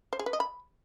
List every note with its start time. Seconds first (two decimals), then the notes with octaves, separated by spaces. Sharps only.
0.13 C5
0.19 G#4
0.26 B4
0.33 D#5
0.40 B5